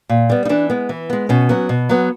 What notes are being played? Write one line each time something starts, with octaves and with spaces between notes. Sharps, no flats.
A#2
G3 B3
D#4
E3 D4
G#3 B3
E3
G#3 B3
B2 C#4
F#3 B3
B2
F#3 B3